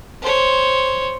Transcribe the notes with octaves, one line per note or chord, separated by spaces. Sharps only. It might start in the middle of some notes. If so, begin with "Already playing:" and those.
C5 C#5